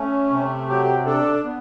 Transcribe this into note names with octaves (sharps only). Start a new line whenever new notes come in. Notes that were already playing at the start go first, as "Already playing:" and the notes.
Already playing: A3 C#4
C3
F#3 G4
D4 A4
B3